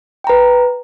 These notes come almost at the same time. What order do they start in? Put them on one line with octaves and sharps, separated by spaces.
G5 A#5 B4